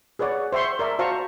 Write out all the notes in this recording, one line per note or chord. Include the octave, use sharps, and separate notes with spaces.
G#4 B4 C#5 D5 F#5
C5 E5 G5 C6 C#6
A#4 D5 E5 A5
F#4 C5 F5 A5 A#5 C#6